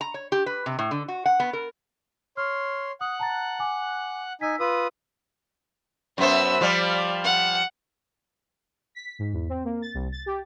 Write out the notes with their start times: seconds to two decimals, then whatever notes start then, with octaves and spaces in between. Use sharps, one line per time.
0.01 A#5
0.14 C#5
0.32 G4
0.46 B4
0.66 C3
0.79 A2
0.91 D3
1.08 F#4
1.25 F#5
1.40 B3
1.53 A#4
2.37 C#5 C6 F6
3.01 F#5 D#6 F#6
3.19 A5 A#5 A6
3.59 G#5 D6
4.41 D#4 G#5 E6 B6
4.60 F4 B4 D#6 E6
6.18 F#2 B3 C5 E5 E6
6.61 F3 G3 D5
7.24 F#5
8.95 B6
9.19 G#2
9.33 E2
9.49 C4
9.64 A#3
9.82 A6
9.94 C2
10.12 A6
10.26 G4